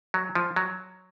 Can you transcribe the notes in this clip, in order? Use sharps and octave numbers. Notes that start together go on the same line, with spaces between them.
F#3
F3
F#3